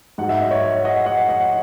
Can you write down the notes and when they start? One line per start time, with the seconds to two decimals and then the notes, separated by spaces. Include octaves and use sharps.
0.18 G#2 F#3 F#5
0.29 E5
0.40 D#5
0.51 C#5 E5
0.84 D#5 F#5
1.06 D#5 F#5
1.29 D#5 F#5